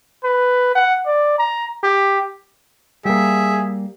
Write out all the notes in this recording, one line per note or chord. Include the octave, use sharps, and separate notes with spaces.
B4
F#5
D5
A#5
G4
G3 A#3 G#4 E5